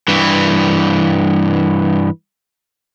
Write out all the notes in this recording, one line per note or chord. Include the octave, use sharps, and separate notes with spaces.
G2 E3